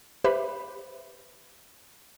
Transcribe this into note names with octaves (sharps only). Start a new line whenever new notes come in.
G4 B4 C5 E5 B5